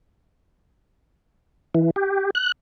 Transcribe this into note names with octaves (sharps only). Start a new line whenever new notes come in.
E3
G4
F#6